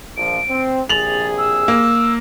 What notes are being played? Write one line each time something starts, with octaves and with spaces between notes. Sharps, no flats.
A#1 F3 D7
C4
A#1 C3 G#4 A6 F7 F#7
E6
A#3